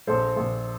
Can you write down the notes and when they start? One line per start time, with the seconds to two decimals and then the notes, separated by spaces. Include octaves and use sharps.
0.07 A#1 A4 C5
0.36 A#1